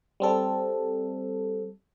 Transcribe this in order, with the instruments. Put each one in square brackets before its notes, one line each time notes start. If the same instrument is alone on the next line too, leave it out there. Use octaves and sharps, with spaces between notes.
[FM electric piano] G3 C4 A4